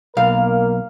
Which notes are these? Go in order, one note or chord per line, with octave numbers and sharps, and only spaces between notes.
B1 A#3 A#4 F5